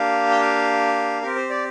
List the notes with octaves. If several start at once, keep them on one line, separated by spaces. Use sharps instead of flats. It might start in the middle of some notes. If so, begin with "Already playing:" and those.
Already playing: A#3 D4 G4 F5
G5
F5
C4 G4 A#4
C5
D5